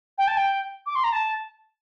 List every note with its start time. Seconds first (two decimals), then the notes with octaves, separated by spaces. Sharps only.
0.18 G5
0.27 A5
0.37 G5
0.86 D6
0.95 C6
1.04 A#5
1.13 A5